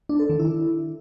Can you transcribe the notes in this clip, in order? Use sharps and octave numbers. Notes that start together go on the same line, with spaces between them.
D4
A4
D#3
E4